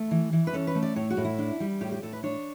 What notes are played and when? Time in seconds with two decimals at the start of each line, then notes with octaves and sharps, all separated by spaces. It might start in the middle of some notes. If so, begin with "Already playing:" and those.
Already playing: A3
0.11 E3
0.33 E3
0.47 B4
0.53 C#4 A4
0.67 B4
0.75 A3
0.83 D5
0.96 A2 C#5
1.10 F#4
1.17 A2
1.25 E4
1.39 D4
1.60 G3
1.81 A2 G4
1.92 G4
2.02 A2 A4
2.13 B4
2.23 D4 C#5